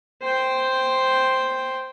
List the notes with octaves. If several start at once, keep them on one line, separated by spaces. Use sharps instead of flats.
C5 G5